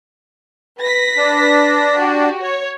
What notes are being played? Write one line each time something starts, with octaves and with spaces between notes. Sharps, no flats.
B4 A#6 B6
D4
F#4 G4
C#5